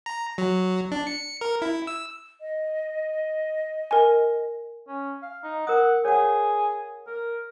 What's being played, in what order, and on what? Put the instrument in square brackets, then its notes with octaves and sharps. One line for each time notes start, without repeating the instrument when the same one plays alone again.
[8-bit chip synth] A#5
F#3
D4
C#7
A#4
E4
E6
[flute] D#5
[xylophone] A#4 G#5
[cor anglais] C#4
F5
D#4
[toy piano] A#4 D#6 [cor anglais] F#5
[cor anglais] G#4 [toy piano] C#5 F#5
[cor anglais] A#4